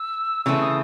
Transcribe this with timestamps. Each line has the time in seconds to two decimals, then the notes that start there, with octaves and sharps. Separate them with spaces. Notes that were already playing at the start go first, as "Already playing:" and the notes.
Already playing: E6
0.46 C#3 E3 A3 C4 E6
0.61 D#6